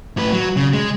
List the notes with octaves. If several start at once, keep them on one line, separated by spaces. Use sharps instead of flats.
A2 B4
F#3
C#3
G#3